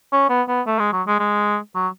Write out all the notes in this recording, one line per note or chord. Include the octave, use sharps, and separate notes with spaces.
C#4
B3
B3
A3
G#3
F#3
G#3
G#3
F#3